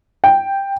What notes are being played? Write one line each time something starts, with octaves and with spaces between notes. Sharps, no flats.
G5